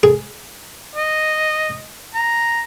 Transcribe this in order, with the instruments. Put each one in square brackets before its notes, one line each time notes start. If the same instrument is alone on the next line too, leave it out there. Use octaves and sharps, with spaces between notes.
[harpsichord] G#4
[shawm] D#5
A#5